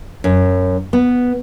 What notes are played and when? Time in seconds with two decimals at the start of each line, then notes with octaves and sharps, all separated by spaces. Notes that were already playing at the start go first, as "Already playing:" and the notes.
0.24 F#2
0.93 B3